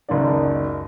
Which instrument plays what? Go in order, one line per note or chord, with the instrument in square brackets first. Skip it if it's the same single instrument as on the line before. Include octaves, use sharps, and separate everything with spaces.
[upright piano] F#1 C#2 F#2 D#4 D5